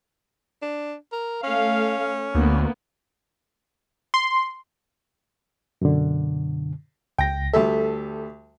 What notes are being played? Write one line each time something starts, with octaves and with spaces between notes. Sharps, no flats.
D4
A#4
A3 C#4 F5
D2 A#3 B3
C6
F#2 B2 D3
C#2 G5 A#6
D2 G3 A4 E5